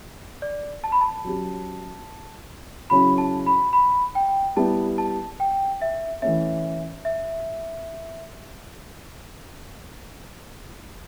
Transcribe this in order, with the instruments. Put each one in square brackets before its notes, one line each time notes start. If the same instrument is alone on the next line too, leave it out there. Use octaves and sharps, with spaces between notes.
[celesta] D5
A5
B5
A5
[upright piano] F#3 C#4 G4
[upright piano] C#3 F#3 C#4 E4 [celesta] B5
[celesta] A5
B5
B5
G5
[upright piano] G3 B3 E4 G4 [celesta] A5
[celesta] A5
G5
E5
[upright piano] E3 A3 C#4 [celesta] E5
[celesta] E5